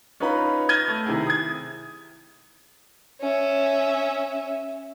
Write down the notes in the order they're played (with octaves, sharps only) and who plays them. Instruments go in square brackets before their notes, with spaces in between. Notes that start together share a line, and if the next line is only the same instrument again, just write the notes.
[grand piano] C#4 D#4 F4 B4 A#5 B5
F6 G6 G#6 A#6 D#7 G7
A3
C3 D#3 E4 G#4
D#6 G#6
[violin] C#4 E5